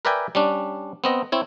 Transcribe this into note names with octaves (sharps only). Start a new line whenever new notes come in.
A#4 B4 D5 E5 G5 G#5
G3 C#4 D4
B3 C4 D#5
C4 E4 C#5